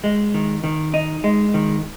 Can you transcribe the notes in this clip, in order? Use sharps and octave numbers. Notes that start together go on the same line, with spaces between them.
G#3
D#3
D#3
D#4
G#3
D#3